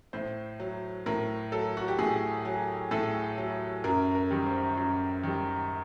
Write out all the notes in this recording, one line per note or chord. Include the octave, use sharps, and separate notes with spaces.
A2 C5
F#3
A2 A#4
F#3 A4
F#4
G4
A2 G#4
F#3
A2 A4
F#3
F#2 A#4
A#4
D#3 G3
C5
F#2
D#3 G3